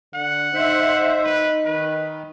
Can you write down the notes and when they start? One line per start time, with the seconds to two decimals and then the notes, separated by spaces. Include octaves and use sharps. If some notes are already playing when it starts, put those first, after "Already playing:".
0.15 D3 F#5
0.54 D#4 C5 E5
1.25 B4
1.65 D#3 B4